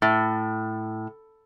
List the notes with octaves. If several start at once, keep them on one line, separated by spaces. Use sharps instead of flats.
A2